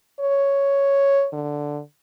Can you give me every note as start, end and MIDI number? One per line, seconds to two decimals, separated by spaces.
0.20 1.28 73
1.33 1.81 50